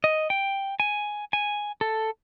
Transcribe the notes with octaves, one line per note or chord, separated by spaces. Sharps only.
D#5
G5
G#5
G#5
A4